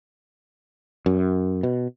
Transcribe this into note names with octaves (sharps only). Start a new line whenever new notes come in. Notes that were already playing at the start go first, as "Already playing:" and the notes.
F#2
B2